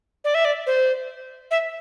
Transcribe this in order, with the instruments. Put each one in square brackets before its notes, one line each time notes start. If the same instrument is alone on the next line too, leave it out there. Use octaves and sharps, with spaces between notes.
[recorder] D5
E5
D5
C5
E5